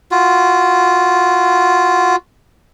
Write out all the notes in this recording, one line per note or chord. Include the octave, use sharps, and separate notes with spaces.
F4 F#4